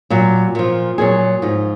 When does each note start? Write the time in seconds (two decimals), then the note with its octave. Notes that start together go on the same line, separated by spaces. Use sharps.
0.10 A#2 F#3
0.55 A#2 F3
0.98 A#2 F#3 G#4
1.42 G#2 F3